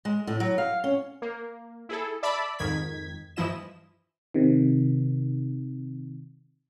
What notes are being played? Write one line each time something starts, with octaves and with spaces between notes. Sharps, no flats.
G#3
A2
F#3
F5
C#4
A#3
E4 G#4 A4
D5 E5 A5 B5
F2 G#2 D#3 G#6 B6
G2 E3 F3 E4 D#5 E7
C3 D#3